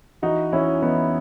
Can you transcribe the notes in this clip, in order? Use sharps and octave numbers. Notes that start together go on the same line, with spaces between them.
E3 D#4 F#4
E3 C#4 E4
E3 B3 D#4